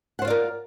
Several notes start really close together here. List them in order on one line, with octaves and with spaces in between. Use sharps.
F#5 C5 F4 D5 A#4